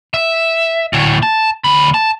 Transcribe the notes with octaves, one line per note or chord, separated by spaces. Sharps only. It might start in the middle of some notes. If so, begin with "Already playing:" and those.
E5
D2 A2
A5
D2 B5
A5